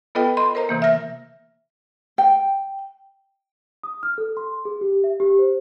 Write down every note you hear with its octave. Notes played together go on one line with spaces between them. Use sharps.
B3 F4 A4 B4 D#5 G5
D#5 B5 C6
A#4 C5 D#5 A#5
C3 E3 A#3
E5 F6 A#6
G5
D#6
F6
A4
C6
G#4
G4
E5
G4
C5